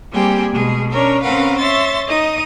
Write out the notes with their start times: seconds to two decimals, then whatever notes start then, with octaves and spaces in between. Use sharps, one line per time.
0.11 G3 A#3 C4 G4 G#4 G5
0.52 B2 G#3 G#4
0.92 C#4 D4 A#4 C#5
1.23 C4 C#4 A#4 B4 F5 F#5
1.59 C#5 E5 C6 A6
2.07 D#4 D#5 D#6